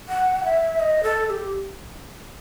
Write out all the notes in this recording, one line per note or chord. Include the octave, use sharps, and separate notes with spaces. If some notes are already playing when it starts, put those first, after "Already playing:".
F#5
E5
D#5
A4
A4
G4